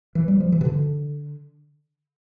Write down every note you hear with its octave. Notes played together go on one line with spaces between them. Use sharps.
E3
G3
F3
E3
C3
D3